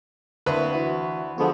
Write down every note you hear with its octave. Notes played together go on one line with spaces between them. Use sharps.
D2 A#3 C4 E4 B4 B5
E3 E4 F#4
D3 F3 G#3 B3 F#4